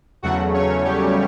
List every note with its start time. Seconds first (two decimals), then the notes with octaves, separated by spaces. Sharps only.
0.23 E2 C#3 F#3 A3 F#4 F#5
0.54 C#4 C#5
0.85 G3 G4